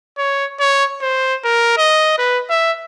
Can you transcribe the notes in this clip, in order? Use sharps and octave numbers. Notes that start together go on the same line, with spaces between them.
C#5
C#5
C5
A#4
D#5
B4
E5